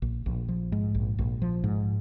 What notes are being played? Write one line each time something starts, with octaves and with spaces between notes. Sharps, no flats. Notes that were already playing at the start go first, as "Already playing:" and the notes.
A#1
A#1
F3
G#2
A#1
A#1
F3
G#2